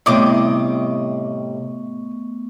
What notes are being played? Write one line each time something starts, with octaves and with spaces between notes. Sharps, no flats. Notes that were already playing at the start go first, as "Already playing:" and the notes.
A2 C3 G3 A3 B3 D#5 C#6 D6